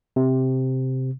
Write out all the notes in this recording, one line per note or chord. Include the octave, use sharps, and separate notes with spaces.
C3